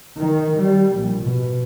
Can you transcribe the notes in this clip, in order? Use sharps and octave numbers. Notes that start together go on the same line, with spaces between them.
D#3
G3
A#1
B2